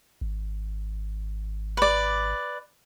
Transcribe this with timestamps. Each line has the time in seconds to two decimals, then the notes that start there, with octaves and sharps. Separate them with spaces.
0.21 G#1
1.77 B4 D5